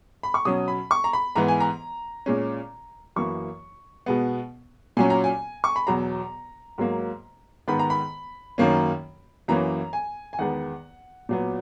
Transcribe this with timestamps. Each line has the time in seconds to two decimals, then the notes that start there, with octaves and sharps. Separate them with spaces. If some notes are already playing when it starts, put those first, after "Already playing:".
0.23 B5
0.34 C#6
0.45 B2 F#3 C#4 D#6
0.68 B5
0.91 C#6
1.04 A#5
1.13 B5
1.36 G#2 E3 B3 A#5
1.48 G#5
1.60 A#5
2.26 A#2 G#3 C#4
3.16 F#2 E3 A#3 C#6
4.06 B2 G#3 B3
4.97 A#2 F#3 C#4 G#5
5.10 A#5
5.24 G#5
5.64 C#6
5.76 B5
5.87 E2 B2 F#3 A#5
6.78 G#2 F#3 A#3
7.68 G#2 D#3 G#3 B3 B5
7.79 A#5
7.90 B5
8.58 F#2 D#3 A#3 C#4
9.48 F#2 E3 A#3 C#4 A#5
9.93 G#5
10.33 G#5
10.39 E2 D#3 G#3 B3 F#5
11.29 A#2 F#3 B3